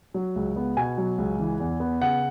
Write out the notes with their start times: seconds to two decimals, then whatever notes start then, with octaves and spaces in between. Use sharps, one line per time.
0.14 F#3
0.36 C#2
0.56 B3
0.77 B2 G#5
0.98 F#3
1.18 C#2
1.40 E3
1.60 E2
1.80 B3
2.02 C#3 F#5